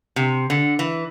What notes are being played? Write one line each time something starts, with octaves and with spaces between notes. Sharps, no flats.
C3
D3
E3